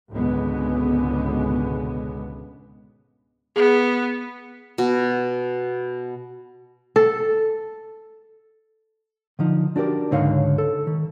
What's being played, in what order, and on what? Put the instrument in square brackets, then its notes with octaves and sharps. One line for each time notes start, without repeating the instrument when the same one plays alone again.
[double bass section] G#1 C#2 B2 D3 G#3 B3
[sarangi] B3 [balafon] G#4
[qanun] B2
[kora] A4
[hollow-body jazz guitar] D3 F3 D#4
D4 F#4 G4 A#4 D5
C#2 G#2 D3 D#4 C#5 F5
A4
D#3